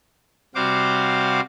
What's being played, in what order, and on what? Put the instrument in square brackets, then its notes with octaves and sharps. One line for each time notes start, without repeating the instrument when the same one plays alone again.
[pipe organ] C3 G3 F#4 C5 F5 D6